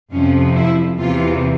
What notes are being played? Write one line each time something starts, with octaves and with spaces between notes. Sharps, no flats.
F2 C3 F3 C#4
E4
E2 C3 E3 F4